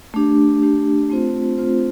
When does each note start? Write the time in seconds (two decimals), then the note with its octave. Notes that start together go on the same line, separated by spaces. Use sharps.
0.14 A3 D4 G4
0.62 A3 D4 G4
1.10 A3 C4 F4 C5
1.58 A3 C4 F4 C5